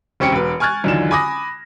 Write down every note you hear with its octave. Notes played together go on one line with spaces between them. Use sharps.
E1 C4 C#4 G4 C#7 D7
E1 B4
G#5 C#6 F6 F#6 G#6 A6
B1 E2 D3 D#3 F4 E7
G#5 B5 D6 D#6 A#6